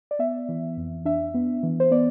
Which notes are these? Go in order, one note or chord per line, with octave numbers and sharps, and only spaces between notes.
D5
B3 E5
E3
F2
D4 E5
B3
E3
C5
B3 D5